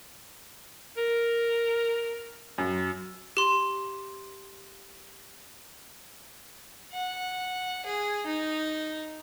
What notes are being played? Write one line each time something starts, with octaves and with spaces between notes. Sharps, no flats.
A#4
F#2
G4 C6
F#5
G#4
D#4